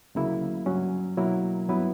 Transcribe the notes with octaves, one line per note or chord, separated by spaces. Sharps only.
D2 C#3 F#3 A#3 E4
G2 F#3 C#4
B2 F#3 A#3 E4 A#4
G2 F#3 B3 E4 B4